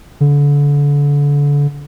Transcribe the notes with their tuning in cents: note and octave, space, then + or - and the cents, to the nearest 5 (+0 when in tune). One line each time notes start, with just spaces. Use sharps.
D3 -30